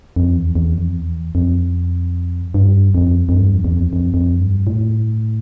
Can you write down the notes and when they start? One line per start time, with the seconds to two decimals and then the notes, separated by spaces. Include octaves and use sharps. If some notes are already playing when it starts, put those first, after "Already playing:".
0.16 F2
0.36 E2
0.55 E2
0.75 F2
0.95 E2
1.35 F2
2.54 G2
2.94 F2
3.29 F2
3.34 G2
3.54 F2
3.65 E2
3.73 F2
3.93 F2
4.14 F2
4.40 G2
4.67 A2